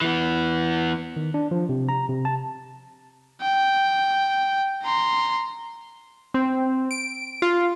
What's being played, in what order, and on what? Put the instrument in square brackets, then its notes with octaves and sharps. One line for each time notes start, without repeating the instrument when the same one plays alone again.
[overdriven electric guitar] E3 B3
[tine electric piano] D#3
D4
F3
C3
A#5
C3
A5
[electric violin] G5
A#5 C6
[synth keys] C4
D7
F4